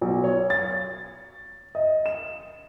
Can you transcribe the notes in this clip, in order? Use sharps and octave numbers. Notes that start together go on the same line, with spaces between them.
B1
C#5
A6
D#5
E7